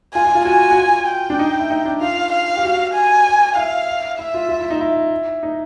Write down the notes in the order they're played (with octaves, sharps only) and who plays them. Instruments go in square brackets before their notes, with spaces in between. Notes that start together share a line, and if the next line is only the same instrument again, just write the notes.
[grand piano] F4 [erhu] G#5
[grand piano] F4
F4
[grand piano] F#4 [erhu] G#5
[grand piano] F#4
F4
[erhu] G5
[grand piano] D4
D#4
E4
D#4
D4
[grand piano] F4 [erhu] F5
[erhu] F5
[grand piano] G4
F#4
[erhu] G#5
[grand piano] E4 [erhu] F5
[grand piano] E4 [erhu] E5
[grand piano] F4
F4
E4
D#4
E4
D#4